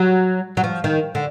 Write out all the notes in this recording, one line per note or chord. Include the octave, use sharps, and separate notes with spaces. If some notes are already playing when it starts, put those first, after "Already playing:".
Already playing: F#3
F#3
F3
D#3
D3